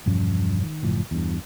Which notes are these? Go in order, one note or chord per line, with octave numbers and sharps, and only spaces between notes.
E1 G2 F3 C#4
D#3
F#1 A2 F3
E2 G2